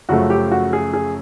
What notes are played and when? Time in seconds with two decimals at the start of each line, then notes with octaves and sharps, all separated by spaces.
0.09 F#2 C#3 F3 A3 F#4
0.30 G4
0.52 F#4
0.73 G#4
0.93 G#4